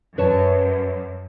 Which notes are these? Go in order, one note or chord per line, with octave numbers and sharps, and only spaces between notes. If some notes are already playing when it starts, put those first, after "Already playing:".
F#2 B4 C#5 A5